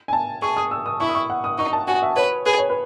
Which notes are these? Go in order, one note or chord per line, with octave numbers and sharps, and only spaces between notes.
G#5
A5
G#4 C#6
D#6
E6
D#6
E4 C#6
D#6
C#6
F#5
D#6
D#4 C#6
A5
F#4 G#5
E5
B4 C#5
G#4 B4
C#5
B4